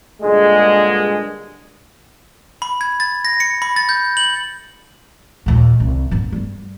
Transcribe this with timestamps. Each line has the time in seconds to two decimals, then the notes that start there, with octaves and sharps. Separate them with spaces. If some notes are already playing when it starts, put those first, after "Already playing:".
0.22 G2 A#2 D3 G#3
2.62 B5
2.81 G#6
3.00 A6
3.25 A#6
3.40 C#7
3.62 B5
3.76 A6
3.89 G6
4.17 F#7
5.46 D#2 A#2
5.80 C2
6.11 G2 B3
6.32 G3